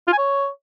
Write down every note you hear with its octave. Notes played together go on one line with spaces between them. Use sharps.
F4
G#5
C#5